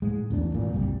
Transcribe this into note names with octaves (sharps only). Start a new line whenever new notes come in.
A2 G#3
A1 E2 D4
G#1 A#2
F#1 C2 G3